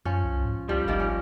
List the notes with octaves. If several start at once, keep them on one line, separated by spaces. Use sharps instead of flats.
F#2 F3 C#4
C2
G#2
C#2 F3 G3
G1 D#3 F3 A#3
C#4